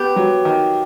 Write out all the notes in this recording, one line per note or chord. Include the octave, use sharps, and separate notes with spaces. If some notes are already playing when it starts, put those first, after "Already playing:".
Already playing: B3 G4
F#3
D#3